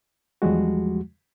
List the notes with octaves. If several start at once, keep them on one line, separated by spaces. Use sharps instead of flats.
E2 F3 G3 G#3 F#4